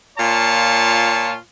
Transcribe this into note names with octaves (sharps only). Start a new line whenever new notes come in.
A#2 F4 C#5 A5